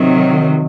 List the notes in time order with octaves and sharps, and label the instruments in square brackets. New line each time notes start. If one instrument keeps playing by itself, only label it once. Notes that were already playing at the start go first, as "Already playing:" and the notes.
Already playing: [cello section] C3 D#3 F#3